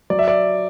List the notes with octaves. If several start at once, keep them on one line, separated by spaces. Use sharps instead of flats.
F#3 D5
E5
D5